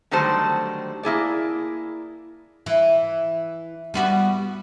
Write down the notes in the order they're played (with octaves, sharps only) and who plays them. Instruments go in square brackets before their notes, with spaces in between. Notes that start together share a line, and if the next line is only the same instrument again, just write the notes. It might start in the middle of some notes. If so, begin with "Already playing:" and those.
[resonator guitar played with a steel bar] D3 D#3 F#3 G3 A3 C5
A#3 E4 G#4 D5
[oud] E3
G3 B3 F#4